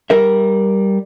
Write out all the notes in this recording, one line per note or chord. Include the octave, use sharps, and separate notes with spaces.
G3 A#4 E5